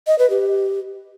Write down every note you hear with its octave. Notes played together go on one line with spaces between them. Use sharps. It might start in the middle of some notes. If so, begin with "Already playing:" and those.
D#5
B4
G4